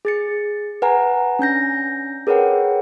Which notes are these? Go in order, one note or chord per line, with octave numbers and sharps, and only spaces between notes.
G#4 A6 C#7
B4 F#5 G#5 A#5
C#4 D4 G6 A#6
G#4 A#4 B4 C#5 F#5 G5